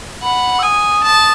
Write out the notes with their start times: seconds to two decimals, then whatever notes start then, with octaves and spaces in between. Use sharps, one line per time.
0.22 F#5 B5
0.59 E6
0.62 G#5 D#6
1.04 A5